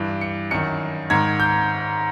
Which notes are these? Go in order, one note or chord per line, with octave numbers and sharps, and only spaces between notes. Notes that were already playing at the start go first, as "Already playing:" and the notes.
Already playing: G2 E3 D7
C#7
F#2 D#3 C#7
G#2 D#3 G#6
G6